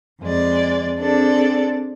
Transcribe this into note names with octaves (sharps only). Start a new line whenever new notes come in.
F2 G#3 D5
C4 D4 G#4 A4 D5